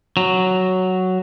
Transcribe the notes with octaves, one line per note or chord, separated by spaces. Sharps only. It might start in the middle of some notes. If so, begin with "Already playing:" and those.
F#3